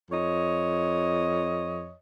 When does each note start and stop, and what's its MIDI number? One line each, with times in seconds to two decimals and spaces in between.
0.11 1.94 41
0.11 1.94 73
0.11 1.94 75